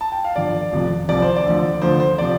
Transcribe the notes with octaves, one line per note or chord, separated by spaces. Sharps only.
A5
G5
F5
G1 G2 F3 D5
F1 F2 C3 F3
C2 C3 F3 D5
C5
D5
D2 D3 F3
D2 D3 F3 C5
C5
C3 F3 D5